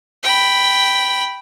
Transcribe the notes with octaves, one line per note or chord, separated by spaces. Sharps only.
G5 B5